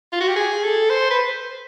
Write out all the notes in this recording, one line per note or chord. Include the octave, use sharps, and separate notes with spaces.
F4
F#4
G4
G#4
A4
C5
B4